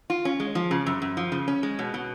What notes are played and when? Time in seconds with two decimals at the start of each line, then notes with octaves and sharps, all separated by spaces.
0.10 F4
0.25 C#4
0.40 G#3
0.55 F3
0.71 C#3
0.86 F#2
1.02 F#2
1.17 F3
1.32 C#3
1.48 C#4
1.63 G#3
1.79 B2
1.94 B2